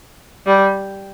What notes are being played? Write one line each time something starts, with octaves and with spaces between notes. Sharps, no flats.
G3